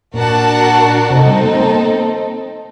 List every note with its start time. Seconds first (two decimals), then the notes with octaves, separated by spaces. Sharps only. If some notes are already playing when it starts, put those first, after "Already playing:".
0.14 A#2 D4 F#4 A#4 F#5 A5
1.10 C3 C4 D#4 A4
1.26 G3
1.43 A#3
1.54 A3
1.59 A#3